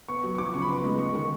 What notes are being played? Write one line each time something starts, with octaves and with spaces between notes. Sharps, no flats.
B3 C#6
F#3
C#6
F3 D6
C#3 C#6
B5
B3 C6
G#3
G#3 C#6
D#3 C#6